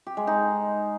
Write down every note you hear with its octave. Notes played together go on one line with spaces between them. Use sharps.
G4
G#3
D#4